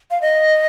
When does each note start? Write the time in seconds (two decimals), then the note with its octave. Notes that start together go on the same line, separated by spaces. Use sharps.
0.11 F5
0.22 D#5